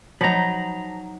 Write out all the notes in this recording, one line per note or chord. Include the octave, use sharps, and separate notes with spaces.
F3 F#3 D#4 A#5 B5